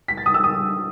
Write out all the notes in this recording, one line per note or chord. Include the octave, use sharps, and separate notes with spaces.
B6
A6
D#6
E6
D#6